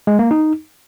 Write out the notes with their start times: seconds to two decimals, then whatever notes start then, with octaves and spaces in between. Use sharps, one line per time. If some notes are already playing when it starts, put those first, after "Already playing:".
0.07 G#3
0.19 A#3
0.31 D#4